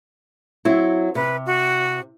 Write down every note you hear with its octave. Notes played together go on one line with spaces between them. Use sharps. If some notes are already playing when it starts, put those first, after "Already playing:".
F#3 C4 E4
C3 B4
F#4